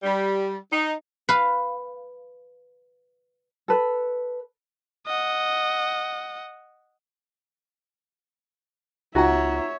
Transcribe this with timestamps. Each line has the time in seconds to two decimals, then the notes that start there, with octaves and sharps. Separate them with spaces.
0.03 G3
0.71 D#4
1.29 B4 F5
3.68 A4 B4
5.07 D#5 F#5
9.15 C#2 D#4 F4 F#4 C#5 E5 F#5 A#5